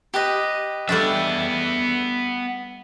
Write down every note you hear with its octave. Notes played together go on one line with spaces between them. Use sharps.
G4 B4 D#5
G3 A3 B3 D4 E5